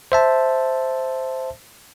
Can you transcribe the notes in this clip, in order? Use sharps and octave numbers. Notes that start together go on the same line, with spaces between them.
C5 E5 A5